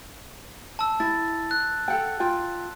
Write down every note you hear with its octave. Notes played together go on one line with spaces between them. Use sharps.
A5 E6
E4 A6
F#6
A4 F#5 G5
F4 G5